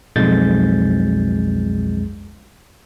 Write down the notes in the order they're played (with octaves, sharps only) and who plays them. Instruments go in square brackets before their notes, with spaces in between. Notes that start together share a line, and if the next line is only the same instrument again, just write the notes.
[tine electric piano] B1 F2 G#3 G6 A6